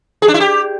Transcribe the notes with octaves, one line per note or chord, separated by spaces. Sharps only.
G#4
D4
E4
G4